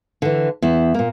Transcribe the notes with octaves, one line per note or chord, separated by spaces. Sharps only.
D3 E3
E2 E4
A#2 A#3